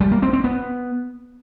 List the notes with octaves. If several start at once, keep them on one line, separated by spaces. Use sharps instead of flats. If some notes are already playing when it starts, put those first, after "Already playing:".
G3
A#3
C4
C4
B3